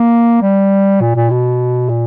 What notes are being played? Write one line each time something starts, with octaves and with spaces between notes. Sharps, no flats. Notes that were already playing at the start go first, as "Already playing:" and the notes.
Already playing: A#3
G3
A#2
A#2
B2
A#2